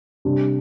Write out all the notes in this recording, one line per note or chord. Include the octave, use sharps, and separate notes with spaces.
C3 G3 D4